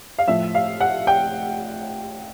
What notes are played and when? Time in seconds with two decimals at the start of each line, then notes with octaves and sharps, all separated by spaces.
0.19 F5
0.28 A2 F3 E5
0.55 F5
0.80 F#5
1.07 G5